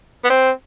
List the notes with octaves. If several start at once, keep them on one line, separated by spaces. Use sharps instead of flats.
B3
C4